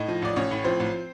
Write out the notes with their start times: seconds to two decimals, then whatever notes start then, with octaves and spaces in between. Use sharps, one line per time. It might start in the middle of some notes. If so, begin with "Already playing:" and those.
Already playing: A2 D#4 D#5
0.08 F3
0.22 A1 D5
0.36 A1 C#4 C#5
0.51 A2
0.64 F3 C4 C5
0.80 A1